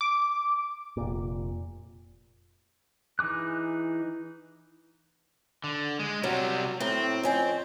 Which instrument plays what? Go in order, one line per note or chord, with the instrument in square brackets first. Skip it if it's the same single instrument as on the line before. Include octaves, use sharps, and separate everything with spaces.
[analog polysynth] D6
[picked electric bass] F1 A#2
[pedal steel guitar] E3 D#4 G#4 D6 F#6
[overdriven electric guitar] D3
G#3
[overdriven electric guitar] C3 G3 [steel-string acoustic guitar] F#3
[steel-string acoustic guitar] A2 A3 A#5 [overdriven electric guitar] C4
[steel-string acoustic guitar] F2 C#4 G5